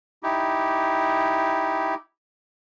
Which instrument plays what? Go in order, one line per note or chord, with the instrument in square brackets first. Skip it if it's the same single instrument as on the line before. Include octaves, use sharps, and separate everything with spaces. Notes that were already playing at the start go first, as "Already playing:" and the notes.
[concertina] D#4 E4 G4